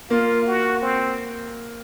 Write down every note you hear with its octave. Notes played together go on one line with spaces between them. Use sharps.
A#3 F4
F#4
C4